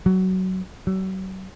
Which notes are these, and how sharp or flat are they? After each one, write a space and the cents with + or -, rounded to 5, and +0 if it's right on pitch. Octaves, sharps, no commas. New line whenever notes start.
F#3 +15
F#3 +40